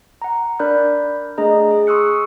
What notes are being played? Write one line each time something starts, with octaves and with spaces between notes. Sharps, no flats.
F#5 A#5
D4 A#4 D5 B5 F#6 G6
A3 D4 G#4 D#5 A#5
G#4
C6 C#6 D#6 E6 F#6 C#7